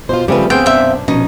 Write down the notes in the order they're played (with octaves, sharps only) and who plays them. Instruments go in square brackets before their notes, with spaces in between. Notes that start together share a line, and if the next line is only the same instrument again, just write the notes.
[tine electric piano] B2 [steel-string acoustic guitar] F4 F#4 C5
[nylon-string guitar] C#3 B4 [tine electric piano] F3 C4 G4 [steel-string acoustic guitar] G3 A3 B3
[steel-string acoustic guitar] D2 G#4 [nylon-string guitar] B3 C4 [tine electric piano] F5 C6 E6 [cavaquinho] G5
[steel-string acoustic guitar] F#2 B2 D4 [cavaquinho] E5 G5
[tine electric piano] A#1 [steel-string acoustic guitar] B2 [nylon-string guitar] C#4 [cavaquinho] D#4